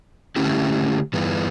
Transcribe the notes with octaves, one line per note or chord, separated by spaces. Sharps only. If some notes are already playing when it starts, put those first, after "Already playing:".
D3 A3 C#4 E4 G4
G2 E3 B3